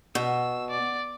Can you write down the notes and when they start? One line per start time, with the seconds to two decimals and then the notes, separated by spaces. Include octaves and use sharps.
0.15 B2 E6
0.70 D5